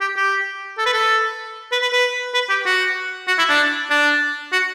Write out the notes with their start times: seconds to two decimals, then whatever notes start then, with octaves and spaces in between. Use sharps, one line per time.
0.01 G4
0.17 G4
0.78 A4
0.86 B4
0.93 A4
1.72 B4
1.82 B4
1.93 B4
2.34 B4
2.49 G4
2.66 F#4
3.28 F#4
3.38 E4
3.49 D4
3.91 D4
4.52 F#4